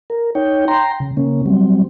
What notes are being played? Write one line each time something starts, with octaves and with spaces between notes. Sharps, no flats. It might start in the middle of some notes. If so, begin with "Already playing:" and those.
A#4
D#4 C#5 G5
G5 A#5 C6
C#3
C#3 A#3 C#4
F#3 G3 C4